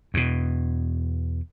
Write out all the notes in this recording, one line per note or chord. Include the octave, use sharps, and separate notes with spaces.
E2 B2